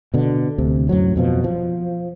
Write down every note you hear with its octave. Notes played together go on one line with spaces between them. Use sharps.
B2 D3
D2 C3
F#2 A2 F#3
F2 B2 F3
F3